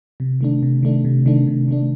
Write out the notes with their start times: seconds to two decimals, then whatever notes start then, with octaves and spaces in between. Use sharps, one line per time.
0.20 C3
0.41 D#3 A3 D4
0.63 C3
0.83 D#3 A3 D4
1.05 C3
1.26 D#3 A3 D4
1.47 C3
1.68 D#3 A3 D4